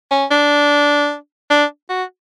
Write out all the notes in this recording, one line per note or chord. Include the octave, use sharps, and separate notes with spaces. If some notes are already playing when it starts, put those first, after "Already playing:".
C#4
D4
D4
F#4